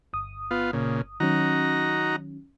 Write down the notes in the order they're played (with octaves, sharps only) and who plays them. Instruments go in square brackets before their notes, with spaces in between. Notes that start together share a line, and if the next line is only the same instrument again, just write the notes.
[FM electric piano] G1 D#6
[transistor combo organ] B3 F4
A#2 C#3
[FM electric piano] D#3 F#3 C#4 [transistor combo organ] D#4 F#4 A#5